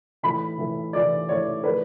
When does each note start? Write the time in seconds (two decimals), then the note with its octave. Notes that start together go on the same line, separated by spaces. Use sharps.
0.23 A2 E3 B5
0.58 A2 E3
0.93 A2 E3 D5
1.29 A2 E3 C#5
1.64 A2 E3 B4